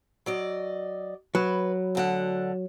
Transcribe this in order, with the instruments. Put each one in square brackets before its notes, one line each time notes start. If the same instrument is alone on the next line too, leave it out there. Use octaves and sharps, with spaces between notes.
[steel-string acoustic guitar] F#3 D5 D#5
[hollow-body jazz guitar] F#3 [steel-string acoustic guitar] B4
[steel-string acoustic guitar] D2 D3 F#5